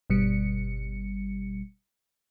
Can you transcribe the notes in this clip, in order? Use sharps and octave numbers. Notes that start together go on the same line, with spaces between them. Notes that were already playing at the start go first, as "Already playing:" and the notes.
G1 B2 G3 C#7